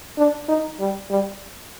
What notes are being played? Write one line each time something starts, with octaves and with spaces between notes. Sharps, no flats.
D4
D#4
G3
G3